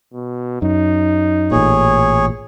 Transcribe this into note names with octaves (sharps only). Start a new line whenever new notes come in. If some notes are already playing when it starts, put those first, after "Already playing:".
B2
F#2 D#4
A1 A#2 G#4 C#5